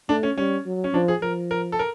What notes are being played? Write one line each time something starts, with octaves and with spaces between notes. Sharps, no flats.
A3 D4
C#4
G3 C#4
F#3
C#4
F3 D4
G#4
F3 A#4
A#4
A4
A#4